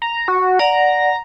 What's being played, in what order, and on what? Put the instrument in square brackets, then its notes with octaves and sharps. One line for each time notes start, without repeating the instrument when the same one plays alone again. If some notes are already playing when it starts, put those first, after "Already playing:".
[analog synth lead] A#5
F#4
[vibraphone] D5 F#5 [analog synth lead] A#5